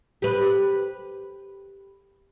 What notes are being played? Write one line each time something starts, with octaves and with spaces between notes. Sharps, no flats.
G4 B4